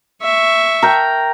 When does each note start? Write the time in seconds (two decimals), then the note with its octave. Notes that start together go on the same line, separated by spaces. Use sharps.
0.22 E5 C#6
0.83 A#4 G5